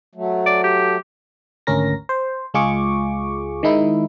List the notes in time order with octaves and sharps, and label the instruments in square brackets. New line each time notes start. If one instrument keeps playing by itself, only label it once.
[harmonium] F#3 A3
[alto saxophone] D5
G4
[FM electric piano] G#1 D2 C#4 A#4 A#6
C5
C#2 G#3 F4 G#4 C#6 D6
D#3 G#3 D#4 E4